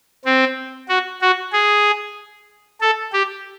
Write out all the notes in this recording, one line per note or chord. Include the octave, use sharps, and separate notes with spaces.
C4
F#4
F#4
G#4
A4
G4